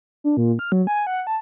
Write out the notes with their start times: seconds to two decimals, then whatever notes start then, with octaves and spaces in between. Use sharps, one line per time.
0.24 D4
0.37 A#2
0.59 F6
0.72 F#3
0.87 G#5
1.07 F#5
1.27 A5